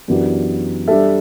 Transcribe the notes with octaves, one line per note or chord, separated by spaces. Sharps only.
F#2 E3 B3 D4 G4
G3 D4 A4 E5